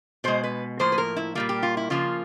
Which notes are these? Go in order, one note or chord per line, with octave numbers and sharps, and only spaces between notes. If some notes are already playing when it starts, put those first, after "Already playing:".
B2 G#3 C5
B4
A2 F3 A#3 C5
B4
A#4
E4
A#2 G3 A#3 F4
G4
F4
E4
C#3 F3 A#3 F4